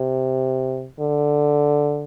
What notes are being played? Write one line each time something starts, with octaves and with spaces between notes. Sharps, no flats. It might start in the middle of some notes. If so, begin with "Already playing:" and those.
Already playing: C3
D3